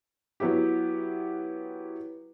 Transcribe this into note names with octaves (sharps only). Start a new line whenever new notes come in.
F#3 B3 E4 G4